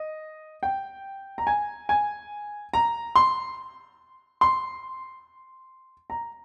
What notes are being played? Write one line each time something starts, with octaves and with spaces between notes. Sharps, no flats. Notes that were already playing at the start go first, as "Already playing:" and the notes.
Already playing: D#5
G5
A#5
G#5
G#5
A#5
C6
C6
A#5